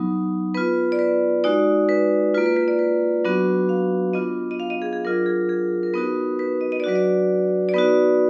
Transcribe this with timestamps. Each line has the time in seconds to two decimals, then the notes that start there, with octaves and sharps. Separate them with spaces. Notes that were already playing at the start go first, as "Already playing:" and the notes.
Already playing: F#3 B3 D#4
0.54 B3 F4 B4
0.92 D5
0.99 B4
1.44 G#3 D#4 F#4 D5
1.89 B4
2.34 F4 B4
2.38 A#3
2.46 B4
2.57 B4
2.68 D5
2.79 B4
3.25 F#3 B3 D4 F#4
3.69 F5
4.13 B3 D4 F4 D#5
4.51 D#5
4.60 F5
4.70 D#5
4.82 G#4
4.93 G#4
5.05 F#3 D4 F4 A#4
5.26 G#4
5.49 G#4
5.83 A#4
5.93 B3 D#4 F#4 B4
6.39 B4
6.61 D#5
6.72 D#5
6.80 D5
6.84 F#3 D4 F#4 B4
6.95 D5
7.69 D5
7.74 B3 D#4 F#4 B4